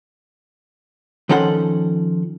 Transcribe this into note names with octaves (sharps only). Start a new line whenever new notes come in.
D#3 F3 C#4 A4 F#5 C6